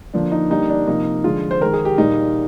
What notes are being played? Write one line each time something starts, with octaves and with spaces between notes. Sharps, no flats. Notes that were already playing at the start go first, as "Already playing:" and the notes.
D3 F3 A#3 D4
D#4
D3 G3 A#3 D#4
D4
C3 F3 A#3 D#4
D3 F3 G#3 F4
C5
D#3 G#3 A#4
G#4
G4
A#2 G3 A#3 D#4